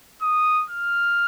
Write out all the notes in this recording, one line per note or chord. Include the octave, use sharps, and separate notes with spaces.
D#6
F6